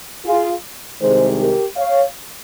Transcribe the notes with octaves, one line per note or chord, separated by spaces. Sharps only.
F4 G#4
C2 C3 D#3 G#3 G#4 C5
G4 A#4
C#5 F5